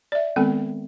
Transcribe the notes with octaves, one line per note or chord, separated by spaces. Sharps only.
D5 E5
D#3 G#3 B3 C4 A4 G#5